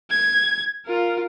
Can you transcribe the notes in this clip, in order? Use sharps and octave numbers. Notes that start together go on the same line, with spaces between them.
G#6
F4 A#4